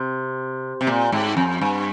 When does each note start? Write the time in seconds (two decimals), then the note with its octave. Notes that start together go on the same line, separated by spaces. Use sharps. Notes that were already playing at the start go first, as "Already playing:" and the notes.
Already playing: C3
0.81 C3
0.87 A#2
1.12 G#2
1.37 F2
1.61 G2